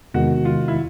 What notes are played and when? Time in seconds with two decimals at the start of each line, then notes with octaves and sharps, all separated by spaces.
0.14 E2 C3 D#3 G#3 B3 F#4
0.45 F4
0.68 E4